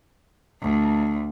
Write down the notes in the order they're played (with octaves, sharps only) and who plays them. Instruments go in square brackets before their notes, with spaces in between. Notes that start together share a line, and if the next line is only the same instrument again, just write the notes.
[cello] D2